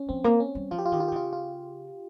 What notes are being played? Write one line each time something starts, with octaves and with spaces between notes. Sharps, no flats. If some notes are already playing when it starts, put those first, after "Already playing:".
Already playing: C#4
F3 C4
A#3
C#4
G3
F3 F4
G4
F4
D#3 G4
F4
G4
C#3 F4
F4